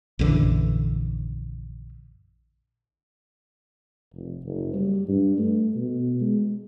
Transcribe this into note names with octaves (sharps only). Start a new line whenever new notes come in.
A#1 F#2 D3 E3
F1
F#1
G3
G2
A3
B2
G#3